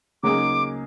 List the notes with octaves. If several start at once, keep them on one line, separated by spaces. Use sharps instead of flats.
C#3 F#3 A#3 D#4 G#4 D6